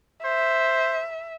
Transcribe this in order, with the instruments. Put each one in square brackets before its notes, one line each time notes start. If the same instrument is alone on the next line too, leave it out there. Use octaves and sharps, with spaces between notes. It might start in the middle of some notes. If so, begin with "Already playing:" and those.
[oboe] C5 [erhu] E5